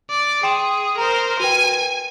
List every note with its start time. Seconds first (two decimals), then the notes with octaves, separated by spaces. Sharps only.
0.10 D5
0.43 G#4 G5 C6 E7
0.98 A#4 C5 A#5
1.40 F#4 B4 G5 G#5